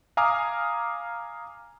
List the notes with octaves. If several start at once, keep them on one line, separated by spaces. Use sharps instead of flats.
F5 G#5 A#5 D6 D#6 F6